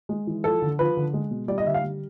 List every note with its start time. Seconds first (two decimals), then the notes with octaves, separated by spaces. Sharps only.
0.09 G#3
0.27 E3
0.44 F3 A4
0.62 D3
0.79 F3 B4
0.97 D3
1.14 G#3
1.31 B2
1.48 G3 D5
1.58 D#5
1.65 D3 E5
1.74 F5
1.84 G3